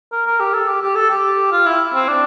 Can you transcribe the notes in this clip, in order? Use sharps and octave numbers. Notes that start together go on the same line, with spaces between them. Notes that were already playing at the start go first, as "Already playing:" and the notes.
A#4
A#4
G4
A4
G4
G4
A4
G4
F4
E4
C4
D4